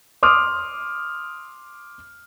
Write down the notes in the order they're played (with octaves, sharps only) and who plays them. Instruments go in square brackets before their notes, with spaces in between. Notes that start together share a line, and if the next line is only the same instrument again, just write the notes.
[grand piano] C6 D6 D#6 F6